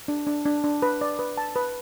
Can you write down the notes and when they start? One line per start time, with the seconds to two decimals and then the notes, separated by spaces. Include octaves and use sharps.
0.08 D4
0.27 D4
0.45 D4
0.64 D4
0.82 B4
1.01 D5
1.19 B4
1.38 A5
1.56 B4